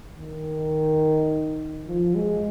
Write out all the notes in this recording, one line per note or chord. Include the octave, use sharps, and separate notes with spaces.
D#3
F3
G#3